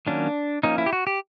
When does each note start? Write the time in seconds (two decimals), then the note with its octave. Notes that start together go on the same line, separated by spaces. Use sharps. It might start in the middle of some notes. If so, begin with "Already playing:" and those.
0.07 D#3 F#3 A#3 C#4 D4
0.63 F3 A#3 C#4 D#4
0.78 E4
0.86 G4
0.93 F#4
1.07 G4